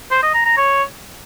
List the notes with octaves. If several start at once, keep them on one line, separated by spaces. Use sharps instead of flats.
C5
D#5
A#5
A#5
C#5